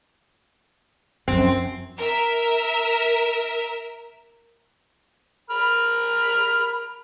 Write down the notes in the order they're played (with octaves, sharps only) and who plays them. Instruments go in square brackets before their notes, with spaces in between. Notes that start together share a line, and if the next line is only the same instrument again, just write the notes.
[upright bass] F#2 F3 [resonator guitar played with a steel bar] C4
[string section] A#4 E5
[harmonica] A#4 B5 F6